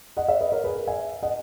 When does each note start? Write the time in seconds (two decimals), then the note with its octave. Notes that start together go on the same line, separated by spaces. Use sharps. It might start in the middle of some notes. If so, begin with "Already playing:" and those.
0.17 D#5 F#5
0.28 C#5 E5
0.40 B4 D#5
0.52 A#4 C#5
0.64 G#4 B4
0.75 A#4
0.87 E5 G#5
1.23 D#5 F#5